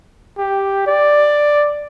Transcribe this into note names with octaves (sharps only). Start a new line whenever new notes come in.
G4
D5